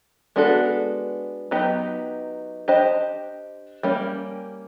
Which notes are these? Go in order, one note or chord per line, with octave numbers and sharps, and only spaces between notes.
G#3 B3 D4 F#4 A4
F#3 B3 D#4 G4
D4 G4 C5 D#5
G3 A#3 C#4